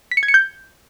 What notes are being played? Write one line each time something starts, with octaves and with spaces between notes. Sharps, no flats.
B6
C#7
G#6
C#7
G6